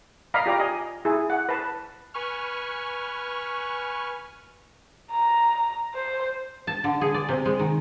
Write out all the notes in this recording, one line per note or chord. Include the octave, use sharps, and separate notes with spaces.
D5 D#5 F5 A#5 B5
F4 G4 D5 A#5 D6
D#5 G#5
E4 G#4
F#5
B4 A5
B4 G#5 C#6 F6
A#5
C5
A5
D3
G#4
D5
C3
G#3
D#3